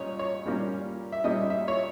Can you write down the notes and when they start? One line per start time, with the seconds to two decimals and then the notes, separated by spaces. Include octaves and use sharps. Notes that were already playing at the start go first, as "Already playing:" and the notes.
Already playing: A#2 G3 C#4 C#5 D#5
0.19 C#5
0.45 A#2 G3 A#3 C#4
1.12 E5
1.24 A#2 G3 A#3 C#4 D#5
1.50 E5
1.68 C#5